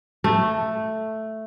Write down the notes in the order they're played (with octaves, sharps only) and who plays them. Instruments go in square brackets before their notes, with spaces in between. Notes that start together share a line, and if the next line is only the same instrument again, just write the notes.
[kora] A3